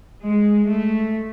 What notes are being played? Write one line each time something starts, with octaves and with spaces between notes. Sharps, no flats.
G#3
A3